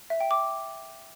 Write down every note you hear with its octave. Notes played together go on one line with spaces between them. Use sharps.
E5
G5
D6